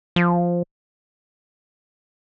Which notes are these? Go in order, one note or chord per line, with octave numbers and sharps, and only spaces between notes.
F3